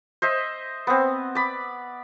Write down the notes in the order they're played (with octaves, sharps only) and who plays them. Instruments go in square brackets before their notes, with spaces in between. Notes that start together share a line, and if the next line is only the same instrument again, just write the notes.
[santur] C5 D#5 E5
B3 C4
D5 B5